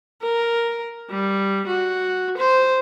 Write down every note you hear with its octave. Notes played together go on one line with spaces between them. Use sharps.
A#4
G3
F#4
C5